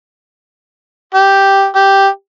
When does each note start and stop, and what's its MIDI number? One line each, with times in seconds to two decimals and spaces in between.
1.15 1.67 67
1.76 2.07 67